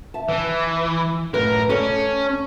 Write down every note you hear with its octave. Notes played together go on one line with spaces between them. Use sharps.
E5 A5
E3
F#2 A2 A#4 B4
C#4 A4 D5